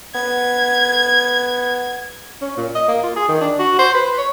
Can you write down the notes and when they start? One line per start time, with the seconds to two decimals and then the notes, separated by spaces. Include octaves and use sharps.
0.15 B3 G#6
2.42 C#4
2.57 A#2
2.75 D#5
2.88 A#3
3.03 F4
3.16 G#4
3.28 D#3
3.41 D4
3.59 F#4
3.79 C5
3.94 B4
4.18 C#5